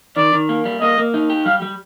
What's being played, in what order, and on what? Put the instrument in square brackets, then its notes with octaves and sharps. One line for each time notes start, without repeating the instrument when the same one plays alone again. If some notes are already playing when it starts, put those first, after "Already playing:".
[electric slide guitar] D#3 [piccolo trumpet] D5
[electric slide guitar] D#3
A#3
G3
[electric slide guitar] A#3 [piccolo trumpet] D#5
[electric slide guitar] A#3
D#4
G4
[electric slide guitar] G3 [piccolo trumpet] F5
[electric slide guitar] G3